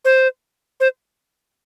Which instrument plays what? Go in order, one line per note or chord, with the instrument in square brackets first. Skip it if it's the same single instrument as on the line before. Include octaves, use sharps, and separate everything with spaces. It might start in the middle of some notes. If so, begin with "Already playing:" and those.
[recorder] C5
C5